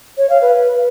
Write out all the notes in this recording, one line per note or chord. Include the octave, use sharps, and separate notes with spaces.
C#5
F5
B4